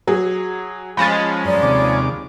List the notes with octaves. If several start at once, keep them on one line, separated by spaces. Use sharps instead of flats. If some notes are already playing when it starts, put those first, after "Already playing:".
F#3 G#4
F3 G#3 C#4 B5 A6
F#2 C#5 D5 A#5
D#2 C3 D6